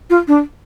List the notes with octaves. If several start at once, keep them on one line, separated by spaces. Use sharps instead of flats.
F4
D4